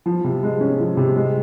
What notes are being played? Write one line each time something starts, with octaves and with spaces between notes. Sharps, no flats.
F3
C3
G#3
C#4
F3
C3
G#3